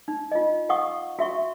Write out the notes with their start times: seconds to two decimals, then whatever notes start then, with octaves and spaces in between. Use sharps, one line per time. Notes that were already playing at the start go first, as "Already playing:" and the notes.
0.08 D#4
0.32 F4 D#5
0.69 F5 F#5 C#6 D#6
1.19 F#4 E5 C#6